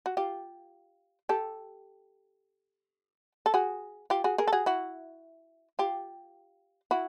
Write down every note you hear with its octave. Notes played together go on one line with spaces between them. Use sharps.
F#4
F4 G4
G4 A4
A4
F#4 G#4
F4 G4
F#4 G#4
G#4 A#4
A4
F#4 G#4
E4 F#4
F4 G4
E4 F#4